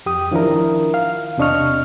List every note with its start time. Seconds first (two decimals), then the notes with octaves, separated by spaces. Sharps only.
0.06 F2 G4 D#6
0.31 D#3 F3 D4 E4 A#4
0.94 F5
1.38 E2 C3 D4 D#5 C#6 F6